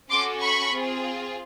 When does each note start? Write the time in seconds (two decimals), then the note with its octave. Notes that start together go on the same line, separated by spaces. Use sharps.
0.10 C#4 F#4 A4 C6 D6
0.42 B5 C#6
0.73 C4 F4 G#4